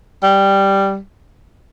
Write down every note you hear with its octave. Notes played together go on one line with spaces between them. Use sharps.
G3